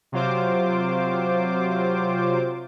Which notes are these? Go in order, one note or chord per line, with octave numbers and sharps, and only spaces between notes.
C3 F#3 F4 C5 D6